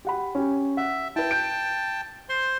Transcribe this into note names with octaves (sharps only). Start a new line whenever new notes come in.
G4 F#5 B5
C#4 G4
E5 F#5
E4 B4 G5 A5
G6 D7
C5 C6